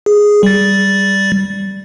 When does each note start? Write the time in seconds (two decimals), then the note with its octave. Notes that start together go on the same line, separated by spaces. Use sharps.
0.06 G#4
0.43 G3 A6